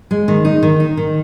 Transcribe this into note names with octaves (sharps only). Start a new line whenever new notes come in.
G#3
D#3
D#4
D#3
D#4
D#3